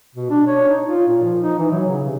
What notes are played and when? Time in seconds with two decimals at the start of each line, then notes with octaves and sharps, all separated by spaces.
0.15 B2
0.30 D4
0.47 C#5
0.69 D#4
0.88 F4
1.08 A#2
1.22 F3
1.41 D#4
1.59 E3
1.71 F#3
1.86 C#3
2.05 C3